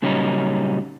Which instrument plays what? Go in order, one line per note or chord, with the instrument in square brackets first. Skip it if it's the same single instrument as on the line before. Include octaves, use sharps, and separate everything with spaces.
[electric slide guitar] A#2 C#3 F#3 G3 C#4 D#4